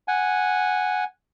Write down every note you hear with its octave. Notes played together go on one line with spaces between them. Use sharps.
F#5 G#5